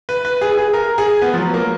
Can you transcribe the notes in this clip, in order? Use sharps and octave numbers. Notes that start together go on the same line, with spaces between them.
B4
B4
G#4
G#4
A#4
G#4
B3
F3
F#3
A#3